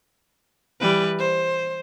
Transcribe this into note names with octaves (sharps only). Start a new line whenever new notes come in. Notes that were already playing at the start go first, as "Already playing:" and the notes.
E3 G3 B4
C5